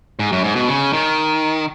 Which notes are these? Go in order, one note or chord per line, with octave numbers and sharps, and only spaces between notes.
G#2
F#2
G#2
B2
C#3
D#3